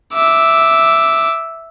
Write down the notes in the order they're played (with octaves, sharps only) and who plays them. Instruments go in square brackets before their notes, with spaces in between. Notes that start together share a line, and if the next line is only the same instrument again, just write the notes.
[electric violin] E5 D6